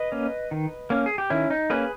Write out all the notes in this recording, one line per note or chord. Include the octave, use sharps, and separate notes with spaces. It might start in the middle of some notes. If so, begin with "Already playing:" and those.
Already playing: B4 D#5
A#3 C#4
D#3
A#3 C#4
G#4
G4
D#3 C#4 E4
D#4
A#3 C#4 G#4 B4